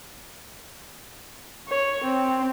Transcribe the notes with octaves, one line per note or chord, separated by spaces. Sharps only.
C#5
C4